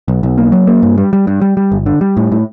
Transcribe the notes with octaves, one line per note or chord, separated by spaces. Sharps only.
B1
B1
A#3
F#3
A#3
G2
G3
G3
G2
G3
G3
G1
D3
G3
A2
A2